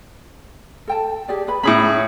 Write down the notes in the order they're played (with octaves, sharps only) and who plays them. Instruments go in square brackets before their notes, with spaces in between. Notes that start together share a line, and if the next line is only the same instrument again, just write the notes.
[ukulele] A4 G5 A5
G4 G#4 D5
G#4 B4 B5
[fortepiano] A2 G#4 B5 [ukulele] C#4 B4